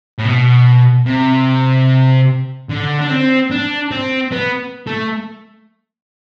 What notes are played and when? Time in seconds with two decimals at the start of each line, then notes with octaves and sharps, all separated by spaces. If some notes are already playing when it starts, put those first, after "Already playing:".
0.19 A2
0.26 B2
1.06 C3
2.69 D3
2.99 D4
3.09 C4
3.51 D4
3.91 C4
4.32 B3
4.87 A3